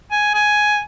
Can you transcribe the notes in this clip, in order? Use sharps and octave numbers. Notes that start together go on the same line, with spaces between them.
G#5
G#5